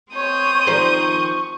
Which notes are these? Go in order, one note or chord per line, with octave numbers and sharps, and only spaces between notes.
C4 C#5 D#6 G6
D#3 F3 C5 C#6